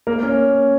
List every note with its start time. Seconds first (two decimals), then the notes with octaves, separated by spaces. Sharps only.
0.07 A#3 A#4
0.23 C#4 C#5